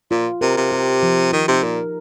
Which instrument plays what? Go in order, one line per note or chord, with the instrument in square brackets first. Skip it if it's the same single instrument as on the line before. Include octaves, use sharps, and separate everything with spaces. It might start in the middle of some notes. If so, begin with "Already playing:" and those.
[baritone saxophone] A#2 [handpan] F4
[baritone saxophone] C3 [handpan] A#4
[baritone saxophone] C3
[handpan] G4
F3
[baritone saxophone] D#3 [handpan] D#4
[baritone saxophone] C3
[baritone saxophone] A#2 [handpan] A#4